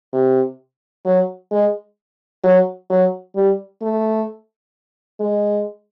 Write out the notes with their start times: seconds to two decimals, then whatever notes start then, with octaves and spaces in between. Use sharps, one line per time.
0.13 C3
1.05 F#3
1.51 G#3
2.43 F#3
2.90 F#3
3.35 G3
3.82 A3
5.20 G#3